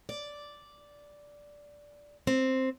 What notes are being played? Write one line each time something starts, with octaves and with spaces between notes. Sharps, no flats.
D5
C4